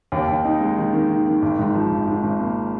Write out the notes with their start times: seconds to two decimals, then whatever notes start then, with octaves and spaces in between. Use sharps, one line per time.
0.12 D#2
0.28 D#2
0.45 D#4
0.61 G#3
0.77 D#3
0.93 D#3
1.10 D#3
1.26 D#3
1.42 G#1
1.59 G#2
1.75 F3
1.91 G#1
2.07 G#2
2.23 G#1
2.40 A#3